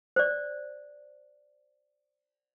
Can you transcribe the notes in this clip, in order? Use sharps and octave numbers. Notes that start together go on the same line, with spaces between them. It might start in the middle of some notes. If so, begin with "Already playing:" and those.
C5 D5